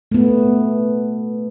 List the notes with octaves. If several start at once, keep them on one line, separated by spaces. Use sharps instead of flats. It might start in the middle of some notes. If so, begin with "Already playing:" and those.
A3 B3